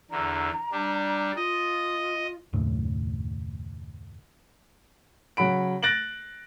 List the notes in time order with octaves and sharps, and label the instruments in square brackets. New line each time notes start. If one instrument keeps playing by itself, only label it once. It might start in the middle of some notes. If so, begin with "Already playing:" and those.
[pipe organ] E2 D3 [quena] A#5
[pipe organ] G3 D4
[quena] F4 [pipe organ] D#5
[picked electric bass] F#1 D#2 A2 C#3
[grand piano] C#3 F#3 F#5 B5 D7
F#6 A6 A#6 D7 F#7